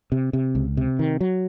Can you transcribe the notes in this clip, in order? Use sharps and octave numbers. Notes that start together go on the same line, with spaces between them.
C3
C3
C#2
C3
D#3
F#3